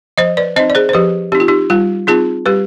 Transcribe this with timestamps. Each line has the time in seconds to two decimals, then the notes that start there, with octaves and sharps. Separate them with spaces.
0.18 F3 C5 D#5
0.37 B4 D5
0.56 C4 D#4 C5 D#5
0.70 D5
0.75 G#4 C5
0.89 C5
0.93 F3 G4 B4
1.32 C4 D#4 G4
1.40 F4
1.48 D#4 G4
1.70 G3 F4
2.07 C4 D#4 F4 G#4
2.46 G3 G4 B4